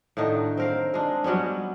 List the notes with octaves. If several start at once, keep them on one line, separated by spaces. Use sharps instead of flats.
A2 D3 D#3 D#4
C4 A#4 F5
G#3 D4
F#3 G3 B3 C#4